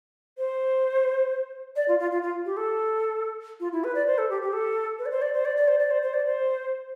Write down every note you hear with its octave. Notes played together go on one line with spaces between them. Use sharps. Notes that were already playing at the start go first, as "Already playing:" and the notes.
C5
D5
F4
F4
F4
F4
G4
A4
F4
E4
B4
D5
C5
A4
G4
G4
A4
B4
D5
C5
D5
C5
D5
D5
C5
D5
C5
C5
D5
C5